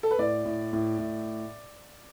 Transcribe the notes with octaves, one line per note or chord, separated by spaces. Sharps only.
A4
B4
A2 D5
A2
A2
A2